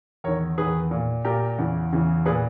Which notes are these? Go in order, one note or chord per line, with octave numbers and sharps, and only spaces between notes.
E2 D#3 A#4 C#5
E2 D#3 G#4 B4
A#2
A#2 G4 A#4
E2 C#3 E3
E2 C#3 E3
A#2 G#4 B4